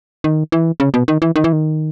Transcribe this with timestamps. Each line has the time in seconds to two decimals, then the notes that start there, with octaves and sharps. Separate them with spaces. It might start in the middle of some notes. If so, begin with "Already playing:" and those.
0.24 D#3
0.52 E3
0.80 C#3
0.94 B2
1.08 D#3
1.22 E3
1.36 D#3
1.44 E3
1.53 D#3